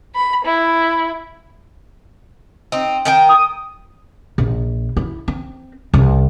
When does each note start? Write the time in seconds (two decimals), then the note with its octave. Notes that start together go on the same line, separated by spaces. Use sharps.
0.15 B5
0.44 E4
2.72 C4 D#4
3.05 D#3 A#4 G5
3.29 D#6
4.38 A#1
4.97 E4
5.28 C4
5.94 C2